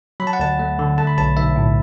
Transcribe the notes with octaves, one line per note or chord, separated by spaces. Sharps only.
F#3 B5
A5
F#5
D2 A5
A3
D3
A3 A5
B5
B1 A5
B1 E5
A2